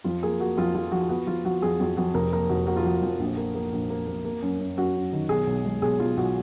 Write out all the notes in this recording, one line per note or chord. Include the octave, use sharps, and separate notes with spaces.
F2 F4
A#3 G#4
A#3 F#4
F2 F4
F3 F4
F3 F#4
B3 F#4
F3 F4
F3 F#4
F2 G#4
F2 F#4
F2 F#4
F1 A#4
A#3 A#4
F1 F#4
A#3 F#4
F4
F3 F#4
F2
A#1
A#3
A#3
A#1
A#3
A#3
A#3
F#2
F#2
F#2 F#4
F#2
D#3
B1 G#4
B1
G#3
B1 G#4
B1 F4
B1 F#4